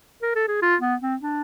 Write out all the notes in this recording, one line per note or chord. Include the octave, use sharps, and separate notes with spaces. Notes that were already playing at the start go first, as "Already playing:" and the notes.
A#4
A4
G#4
F4
B3
C4
D4